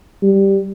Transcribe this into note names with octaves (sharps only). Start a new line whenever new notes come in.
G3